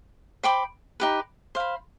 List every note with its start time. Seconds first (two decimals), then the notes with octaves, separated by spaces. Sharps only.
0.43 C5 G5 B5 D6
1.00 D#4 G4 B4
1.55 C5 F5 B5